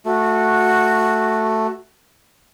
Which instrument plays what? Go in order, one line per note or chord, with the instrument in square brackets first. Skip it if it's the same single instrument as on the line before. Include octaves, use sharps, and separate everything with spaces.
[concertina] A3 [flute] F#4